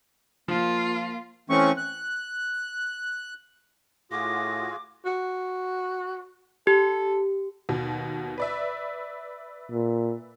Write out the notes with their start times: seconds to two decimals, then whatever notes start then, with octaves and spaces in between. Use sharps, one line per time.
0.48 F3 A#3 F4
1.50 E3 A3 C4 C#4 C#6
1.77 F#6
4.11 A2 F4 F#4 G#4 D6 A#6
5.06 F#4
6.67 G4 A4
7.69 D#2 B2
8.38 B4 D5 E5
9.71 A#2